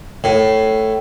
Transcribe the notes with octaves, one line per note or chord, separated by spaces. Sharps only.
A2